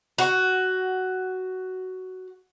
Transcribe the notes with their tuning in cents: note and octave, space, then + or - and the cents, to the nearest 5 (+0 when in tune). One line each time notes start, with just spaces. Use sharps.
F#4 +10